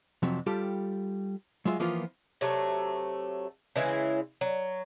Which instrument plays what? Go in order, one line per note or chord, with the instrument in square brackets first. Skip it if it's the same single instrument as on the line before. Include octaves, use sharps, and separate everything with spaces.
[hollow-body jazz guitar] F2 C3 F3 F#3
G3 F4 G4 A4
F#3 G#3 F4 E5
E3 F3 A#3 B3 F4
[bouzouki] C3 F#3 A3
C#3 E3 G#3 E4
F#3